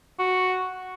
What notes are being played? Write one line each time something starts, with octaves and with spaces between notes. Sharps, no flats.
F#4